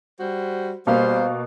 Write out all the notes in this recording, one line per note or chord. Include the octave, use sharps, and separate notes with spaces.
G3 F#4 C5
B2 G3 A#3 C5 F5